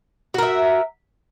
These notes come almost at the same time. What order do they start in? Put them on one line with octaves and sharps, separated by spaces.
F#4 A#4 E5